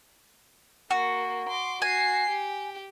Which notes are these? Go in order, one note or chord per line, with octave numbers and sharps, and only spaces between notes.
A#3 F#4
C6 D6
F#4 G#5 C7
G4